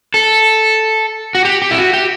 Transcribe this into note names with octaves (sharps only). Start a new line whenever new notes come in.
A4
F#4
G4
G4
E4
F#4
G4